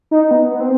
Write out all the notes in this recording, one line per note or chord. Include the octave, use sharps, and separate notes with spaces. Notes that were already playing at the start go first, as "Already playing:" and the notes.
D#4
B3
B3
C4